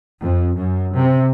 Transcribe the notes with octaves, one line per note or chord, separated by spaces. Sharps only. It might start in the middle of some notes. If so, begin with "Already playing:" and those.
F2
F#2
C3